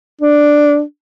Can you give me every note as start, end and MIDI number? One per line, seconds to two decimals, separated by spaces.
0.21 0.81 62